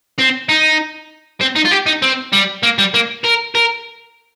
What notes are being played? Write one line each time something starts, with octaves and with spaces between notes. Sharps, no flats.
C4
D#4
C4
D#4
F4
G4
D#4
C4
G3
A#3
G3
A#3
A#4
A#4